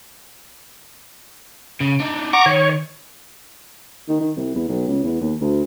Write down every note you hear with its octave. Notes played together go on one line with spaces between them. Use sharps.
C#3
D4 D#4
F#5 A#5 C#6 D6
D#3 C#5
D#3
D#3
C2
E2
B1
C#2
E2
D#2
D2